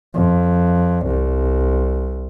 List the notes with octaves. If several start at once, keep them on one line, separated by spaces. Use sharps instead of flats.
F2
C2